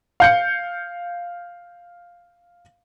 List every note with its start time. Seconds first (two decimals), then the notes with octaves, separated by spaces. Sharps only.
0.20 F5 G6 C#7